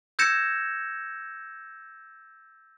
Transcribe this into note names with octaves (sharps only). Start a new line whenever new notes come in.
E6 G6 G#6 A#6 C#7 E7